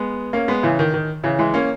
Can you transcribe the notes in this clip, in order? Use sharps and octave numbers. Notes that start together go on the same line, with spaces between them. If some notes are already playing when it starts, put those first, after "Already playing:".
Already playing: G#3 B3
A#3 C#4
G#3 B3
C#3 E3
D#3
D#3
C#3 E3
E3 G#3
A#3 C#4